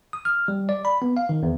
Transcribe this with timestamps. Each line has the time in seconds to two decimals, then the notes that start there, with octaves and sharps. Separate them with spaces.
0.13 D#6
0.25 F6
0.48 G3
0.69 D5
0.85 B5
1.02 B3
1.17 F5
1.29 D#3
1.43 E2